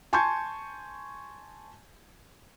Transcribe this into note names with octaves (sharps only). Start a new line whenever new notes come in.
G#5 A5 C6 C#6 G6 G#6